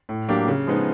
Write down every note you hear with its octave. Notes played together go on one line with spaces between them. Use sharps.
A2
F#3 A#3 D4 G4
C#3
F3 G#3 B3 D#4